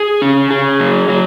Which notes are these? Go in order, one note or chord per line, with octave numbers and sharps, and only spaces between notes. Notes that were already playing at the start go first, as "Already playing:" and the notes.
Already playing: G#4
C#4
G#4
F#3
F#3